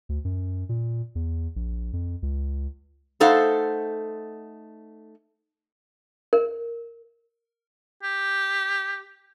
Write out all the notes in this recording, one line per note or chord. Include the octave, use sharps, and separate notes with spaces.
D2
F#2
A#2
E2
A#1
F2
C#2
A3 D#4 A4 C5 F5 F#5
A#4
G4